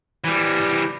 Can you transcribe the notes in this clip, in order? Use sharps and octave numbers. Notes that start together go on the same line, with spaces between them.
E3 G3